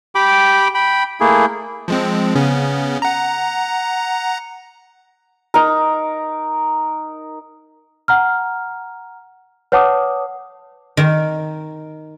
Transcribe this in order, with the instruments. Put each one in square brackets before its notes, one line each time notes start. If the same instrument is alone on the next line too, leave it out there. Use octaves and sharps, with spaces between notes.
[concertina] G4 G5 B5 D6
G5 B5
A3 A#3 E4 G#4
[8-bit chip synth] F3 G#3 C4
C#3 B3 C#4
F#5 A#5
[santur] D#4 A#4
[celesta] F#5 A#5 F6
B4 C#5 F#5 A5 D6 D#6
[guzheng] D#3